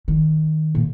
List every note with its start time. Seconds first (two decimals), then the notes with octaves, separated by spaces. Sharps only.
0.08 D#3
0.75 A#2